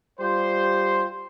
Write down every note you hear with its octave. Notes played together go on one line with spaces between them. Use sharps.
G3 F4 G4 C5